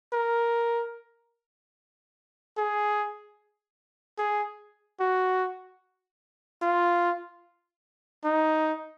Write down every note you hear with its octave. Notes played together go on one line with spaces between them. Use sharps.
A#4
G#4
G#4
F#4
F4
D#4